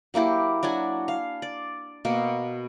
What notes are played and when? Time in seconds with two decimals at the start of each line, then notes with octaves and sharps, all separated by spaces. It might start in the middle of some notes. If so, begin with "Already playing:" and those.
0.14 F#3 A#3 E4 G4
0.63 F#3 D4 F#4 G#5
1.08 F5
1.42 D5
2.05 B2 A#3 A#4